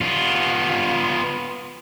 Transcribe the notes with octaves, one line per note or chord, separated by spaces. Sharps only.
B3 F4